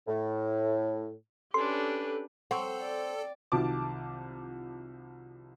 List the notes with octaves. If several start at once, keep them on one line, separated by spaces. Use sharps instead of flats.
A2
C#4 D4 G4 A4 B4 C6
C4 A4 F#5 C#6
D5
C2 D#3 F3 F#3 A5 D6